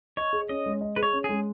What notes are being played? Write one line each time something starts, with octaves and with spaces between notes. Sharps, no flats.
C#5 D#5
G#4
C#4 D#5
G#3
D#5
G#4 B4
C#5
C#4
G#3 G#4